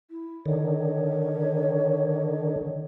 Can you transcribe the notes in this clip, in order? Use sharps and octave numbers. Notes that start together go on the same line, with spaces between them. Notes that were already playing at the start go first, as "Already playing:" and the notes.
E4
D3 D#3 C#5